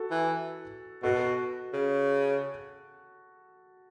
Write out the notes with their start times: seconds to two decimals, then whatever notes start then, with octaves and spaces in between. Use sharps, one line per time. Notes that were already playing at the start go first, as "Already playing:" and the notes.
Already playing: F#4 A4
0.11 E3
1.03 B2 F#4 A4
1.73 C#3